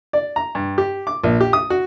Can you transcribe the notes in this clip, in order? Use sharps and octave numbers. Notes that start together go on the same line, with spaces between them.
D5
A#5
G2
G4
D6
A#1
G4
D#6
F#4